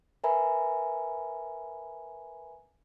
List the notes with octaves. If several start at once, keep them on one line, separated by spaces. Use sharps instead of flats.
A#4 B4 E5 G#5 A#5 B5